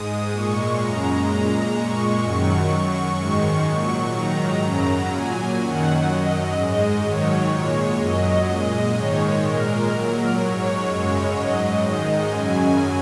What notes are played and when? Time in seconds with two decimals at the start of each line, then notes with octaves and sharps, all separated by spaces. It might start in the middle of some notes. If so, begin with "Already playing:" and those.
Already playing: G#2 G#3 D#6
0.32 A#2 G#3 C#6
0.79 F#2 C#3 G#3 A#5
1.27 A#2 G#3
1.75 A#2 G#3 C#6
2.24 F#2 D#3 F#3
2.70 F#2 F#3 C#6
3.19 G#2 D#3 G#3
3.66 A#2 F#3
4.14 G#2 D#3 F#3 A#5
4.63 F#2 C#3 F#3
5.10 A#2 F#3 G#5
5.58 F#2 D#3 F#3 F#5
6.06 F#2 F#3 D#5
6.54 G#2 G#3
7.01 G#2 D#3 F#3 C#5
7.50 A#2 G#3
7.98 F#2 F#3 D#5
8.46 A#2 G#3
8.93 G#2 D#3 G#3 C#5
9.41 A#2 G#3 A#4
9.89 A#2 F#3
10.37 G#2 F#3 C#5
10.84 F#2 C#3 G#3
11.32 G#2 F#3 D#5
11.80 G#2 D#3 G#3
12.29 F#2 C#3 F#3 G#5